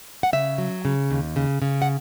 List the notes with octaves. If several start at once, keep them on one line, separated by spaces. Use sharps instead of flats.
F#5
C#3 E5
F#3
C#3
D#2
C#3
C#3
F#5